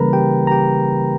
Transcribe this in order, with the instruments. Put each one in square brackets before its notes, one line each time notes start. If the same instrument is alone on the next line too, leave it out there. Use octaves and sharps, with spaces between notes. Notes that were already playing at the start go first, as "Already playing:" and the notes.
Already playing: [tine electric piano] C#3 E3 G3 A#3 A#4 B4 A#5 B5
G4 G5
A#5
G4 G5